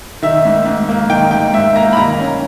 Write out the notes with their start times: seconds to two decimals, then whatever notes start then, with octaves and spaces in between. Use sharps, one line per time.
0.22 D#3 E5
0.45 G#2
0.66 G#2
0.89 A#3
1.10 D#3 G5
1.31 G#2 G5
1.54 G#2 E5
1.75 A#3 A#5
1.93 B5
1.97 D#3 A#5
2.19 C#4